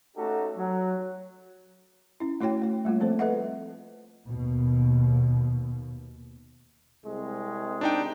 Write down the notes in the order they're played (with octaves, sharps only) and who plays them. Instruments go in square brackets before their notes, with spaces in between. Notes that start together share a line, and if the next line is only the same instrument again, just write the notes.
[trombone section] A3 C#4 D#4 F#4 G4 A4
F#3
[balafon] C#4 E4
A3 E4 F#4 C#5 G5
A3 C#5
G3 A3 A#3 F4
F3 A3 C4 A4 C5
A4 B4 D#5 E5 F#5
[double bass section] D#2 B2
[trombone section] C2 G#3 C4
[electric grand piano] D4 D#4 G5